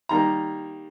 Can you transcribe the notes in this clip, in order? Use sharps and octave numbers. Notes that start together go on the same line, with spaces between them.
D#3 G3 A#3 A#5